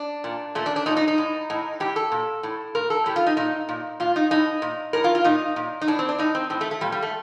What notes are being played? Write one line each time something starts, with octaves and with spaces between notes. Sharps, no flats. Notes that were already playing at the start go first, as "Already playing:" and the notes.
Already playing: D4
A#2
A#2 A3
D4
D4
A#2 D#4
D#4
D#4
A2
A2
A2 G4
A4
A#2
A2
A#2 A#4
A4
A2 G4
F4
D#4
A#2 D#4
A#2
A#2 F4
D#4
A2 D#4
A#2
A2 A#4
F4
F4
A#2 D#4
A#2
D#4
A2 D4
C4
D4
A2 D#4
C4
A2 C4
A3
A3
A#2 G3
G3
A3